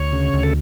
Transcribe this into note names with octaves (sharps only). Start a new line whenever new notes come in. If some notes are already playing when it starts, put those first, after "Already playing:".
Already playing: D2 C#5
C#3
D2
A4